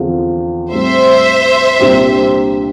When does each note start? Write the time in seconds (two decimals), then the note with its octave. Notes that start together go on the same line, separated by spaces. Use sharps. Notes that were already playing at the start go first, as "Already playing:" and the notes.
Already playing: E2 D3 F3 C4 F4
0.72 A2 G3 C4 C5 E5
1.79 C2 A#2 G3 D4 G4